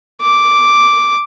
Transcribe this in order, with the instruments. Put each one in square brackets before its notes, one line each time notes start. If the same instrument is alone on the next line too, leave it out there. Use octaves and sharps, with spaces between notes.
[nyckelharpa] D6